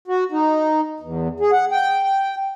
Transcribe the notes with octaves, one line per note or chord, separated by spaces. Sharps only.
F#4
D#4
E2
G#4
F#5
G5
G5